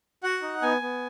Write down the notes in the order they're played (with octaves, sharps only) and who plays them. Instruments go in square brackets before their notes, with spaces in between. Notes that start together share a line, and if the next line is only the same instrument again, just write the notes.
[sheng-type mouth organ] F#4 F#5
D#4
B3 G#5
B3